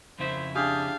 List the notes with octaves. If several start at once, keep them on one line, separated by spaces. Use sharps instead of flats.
F2 C#3 E4 C5
D4 G4 G#4 F5